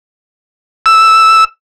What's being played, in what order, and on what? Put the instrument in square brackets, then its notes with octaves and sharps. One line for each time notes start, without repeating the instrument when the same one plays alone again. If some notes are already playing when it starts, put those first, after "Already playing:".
[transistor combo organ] E6